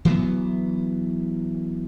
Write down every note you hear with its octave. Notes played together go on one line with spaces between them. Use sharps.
E3 F#3 B3